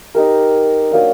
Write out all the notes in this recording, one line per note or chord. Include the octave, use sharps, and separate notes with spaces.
D#4 G4 A#4
F#3 A#3 D4